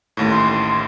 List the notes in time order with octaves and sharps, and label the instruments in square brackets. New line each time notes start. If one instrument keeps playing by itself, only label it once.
[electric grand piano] A1 D#2 A2
[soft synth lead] C6